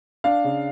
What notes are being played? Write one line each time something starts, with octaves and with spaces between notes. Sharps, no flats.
D4 F5
C#3